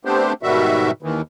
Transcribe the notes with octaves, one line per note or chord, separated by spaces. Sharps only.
A3 B3 C4 D4 G4 C5
G#2 B2 D#3 G3 F#4 E5
D#2 D#3 E3